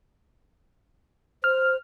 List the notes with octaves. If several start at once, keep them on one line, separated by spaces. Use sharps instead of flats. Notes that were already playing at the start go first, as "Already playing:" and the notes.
C5 F6